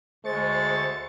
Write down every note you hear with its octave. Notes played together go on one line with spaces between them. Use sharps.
D2 G#3 C5 C#6 A6